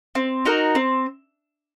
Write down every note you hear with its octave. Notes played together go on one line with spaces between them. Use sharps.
C4
D#4 F#4 A#4
C4